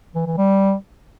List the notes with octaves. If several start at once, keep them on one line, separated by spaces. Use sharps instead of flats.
E3
E3
G3